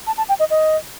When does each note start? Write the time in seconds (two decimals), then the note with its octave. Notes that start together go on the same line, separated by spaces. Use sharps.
0.07 A5
0.18 A5
0.29 G5
0.39 D#5
0.50 D#5